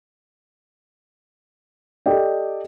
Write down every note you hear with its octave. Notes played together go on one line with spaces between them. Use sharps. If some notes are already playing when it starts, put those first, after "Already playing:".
G4 A4 D5 D#5 G5